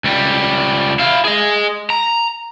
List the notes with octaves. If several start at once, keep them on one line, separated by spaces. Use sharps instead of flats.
C#2 G3
E4 F5
G#4 D#5
A#5